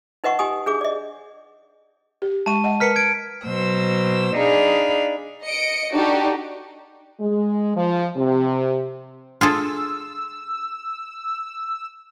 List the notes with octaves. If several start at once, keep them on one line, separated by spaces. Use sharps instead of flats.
D#4 B4 D#5 F#5 C#6
D#4 G4 G#5 D#6
D4 G#4 D6
D5 D#5
G4
G#3 E5 A5 C#6 D#7
D#5 E5 F#5
A#4 B4 A#5 F6 B6 C#7
G#6 D7
B2 F#3 C5 E6
D4 D#4 G#4 F5 B5
D#5 C#7 D7
D4 D#4 F#4 G4 A4
G#3
F3
C3
D4 F4 G#4 A4 E6